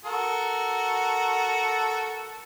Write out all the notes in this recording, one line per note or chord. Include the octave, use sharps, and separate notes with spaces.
F#4 A4 A#4